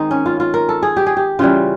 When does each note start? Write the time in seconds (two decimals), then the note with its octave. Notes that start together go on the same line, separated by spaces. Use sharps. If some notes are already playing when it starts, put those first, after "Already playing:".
Already playing: D#3 G#3 C4 D#4
0.11 C#4
0.26 F4
0.40 F4
0.54 A#4
0.69 A4
0.83 G#4
0.97 G4
1.07 G#4
1.17 G4
1.39 C#3 E3 G3 F4